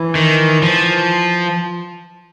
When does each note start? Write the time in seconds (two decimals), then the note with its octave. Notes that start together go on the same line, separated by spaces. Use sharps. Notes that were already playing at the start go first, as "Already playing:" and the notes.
Already playing: E3
0.15 D#3
0.63 F3